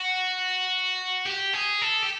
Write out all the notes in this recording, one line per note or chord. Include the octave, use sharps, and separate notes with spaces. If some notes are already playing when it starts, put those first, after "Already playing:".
Already playing: F#4
G4
G#4
A4
G4